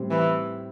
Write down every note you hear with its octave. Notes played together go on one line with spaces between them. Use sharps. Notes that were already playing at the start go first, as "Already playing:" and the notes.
Already playing: A2 G3 C4 G4
E3